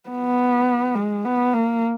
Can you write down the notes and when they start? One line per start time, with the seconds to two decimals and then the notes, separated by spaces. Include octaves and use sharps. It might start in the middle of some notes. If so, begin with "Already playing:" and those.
0.09 B3
0.95 G#3
1.25 B3
1.53 A#3